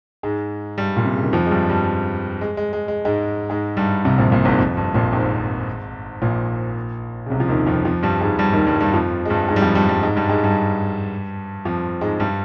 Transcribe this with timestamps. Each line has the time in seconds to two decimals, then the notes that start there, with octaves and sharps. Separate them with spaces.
0.23 G#2 G#3
0.78 G2 G3
0.97 A#2
1.05 C3
1.14 C#3
1.23 D#3
1.33 F2 F3
1.46 G#3
1.51 G2 G3
1.69 G2 G3
2.41 G#3
2.57 G#3
2.73 G#3
2.88 G#3
3.05 G#2 G#3
3.49 G#2 G#3
3.77 G2 G3
4.05 C2 C3
4.18 A#1 A#2
4.32 A#1 A#2
4.45 G#1 G#2
4.58 F2
4.77 G2
4.94 A#1 A#2
5.13 G#1 G#2
6.22 A#1 A#2
7.26 C#3
7.30 C2 C3
7.40 F3
7.48 D#2 D#3
7.66 F2 F3
7.85 F2 F3
8.03 G2 G3
8.21 G#2 G#3
8.39 G2 G3
8.53 D#2 D#3
8.67 G2 G3
8.81 G2 G3
8.94 F2 F3
9.25 G#3
9.30 G2 G3
9.48 G#2 G#3
9.56 G3
9.62 F2 F3
9.75 G2 G3
9.88 G2 G3
10.02 G#2 G#3
10.16 G2 G3
10.29 G#2 G#3
10.43 G2 G3
11.65 F2 F3
12.01 G#2 G#3
12.20 G2 G3